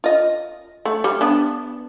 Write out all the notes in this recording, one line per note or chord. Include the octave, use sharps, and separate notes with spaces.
F4 D#5
A3
G3
B3 D4